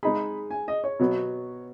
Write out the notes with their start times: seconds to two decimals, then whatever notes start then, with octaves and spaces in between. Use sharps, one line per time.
0.03 G#3 D#4 G#4 B5
0.51 G#5
0.68 D#5
0.84 C#5
0.99 B2 F#3 B3